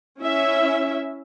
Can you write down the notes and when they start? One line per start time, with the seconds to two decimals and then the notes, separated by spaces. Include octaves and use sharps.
0.20 C#4 E4 E5